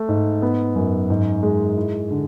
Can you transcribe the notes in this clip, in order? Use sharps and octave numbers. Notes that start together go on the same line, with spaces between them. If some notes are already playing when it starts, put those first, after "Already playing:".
Already playing: A3
G#2
B3
F#2
G#2
G#3
E4
D3